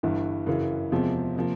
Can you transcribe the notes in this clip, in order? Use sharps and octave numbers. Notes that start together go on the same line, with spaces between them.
G1 G2 E3
F#2 C#3 E3
E2 C3 F3 G#3
C3 F3 A#3